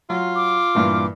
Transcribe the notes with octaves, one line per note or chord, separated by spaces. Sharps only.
F#3 F4
D6
G2 A#2 E3